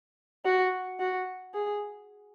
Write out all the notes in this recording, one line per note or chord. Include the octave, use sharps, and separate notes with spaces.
F#4
F#4
G#4